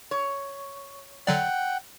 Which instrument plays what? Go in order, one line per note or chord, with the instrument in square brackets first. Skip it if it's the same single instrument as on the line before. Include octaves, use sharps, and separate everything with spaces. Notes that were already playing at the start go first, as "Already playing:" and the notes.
[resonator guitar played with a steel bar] C#5
[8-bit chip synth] D3 F#3 D5 [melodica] F#5 G5